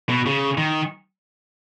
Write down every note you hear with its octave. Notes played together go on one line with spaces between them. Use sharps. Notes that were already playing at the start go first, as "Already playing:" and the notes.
B2
C#3
D#3